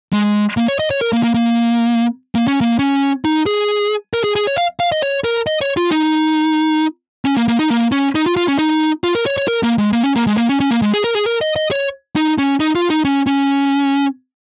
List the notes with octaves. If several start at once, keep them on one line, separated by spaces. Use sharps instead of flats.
G#3
A#3
C#5
D#5
C#5
A#4
A#3
A#3
A#3
A#3
C#4
A#3
C#4
D#4
G#4
A#4
G#4
G#4
C#5
F5
F5
D#5
C#5
A#4
D#5
C#5
F4
D#4
C#4
A#3
A#3
D#4
A#3
C#4
D#4
F4
F4
C#4
D#4
F4
A#4
C#5
C#5
A#4
A#3
G#3
A#3
C#4
A#3
G#3
A#3
C#4
C#4
A#3
G#3
G#4
A#4
G#4
A#4
D#5
D#5
C#5
D#4
C#4
D#4
F4
D#4
C#4
C#4